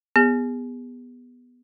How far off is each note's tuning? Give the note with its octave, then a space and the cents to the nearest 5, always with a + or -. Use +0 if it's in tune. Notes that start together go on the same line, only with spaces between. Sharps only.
B3 -5 G#4 -35